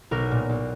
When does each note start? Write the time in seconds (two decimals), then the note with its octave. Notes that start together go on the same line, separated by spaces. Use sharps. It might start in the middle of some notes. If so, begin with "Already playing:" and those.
0.11 B1 A#4
0.31 A#2
0.49 B1